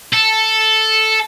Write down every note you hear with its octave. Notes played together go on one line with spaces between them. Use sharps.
A4